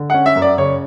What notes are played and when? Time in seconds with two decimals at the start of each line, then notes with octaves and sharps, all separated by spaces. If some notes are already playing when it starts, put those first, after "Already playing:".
Already playing: D3
0.10 C#4 F#5
0.26 E5
0.36 F#2
0.42 D5
0.58 C#3 C#5